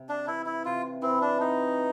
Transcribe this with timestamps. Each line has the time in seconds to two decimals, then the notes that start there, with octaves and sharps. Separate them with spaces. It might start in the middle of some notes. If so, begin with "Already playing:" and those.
Already playing: C3
0.09 D4
0.27 E3 E4
0.46 E4
0.65 C3 F4
1.02 E3 C4
1.21 D4
1.40 C4 D#4